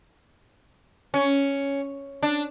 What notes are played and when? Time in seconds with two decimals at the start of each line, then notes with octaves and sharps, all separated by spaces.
1.14 C#4
2.23 D4